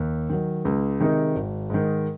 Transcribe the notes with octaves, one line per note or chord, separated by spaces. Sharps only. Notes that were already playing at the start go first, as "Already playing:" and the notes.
Already playing: D#2
D#3 F#3
C#2
C3 D#3 G#3 D#4
G#1
G#2 D#3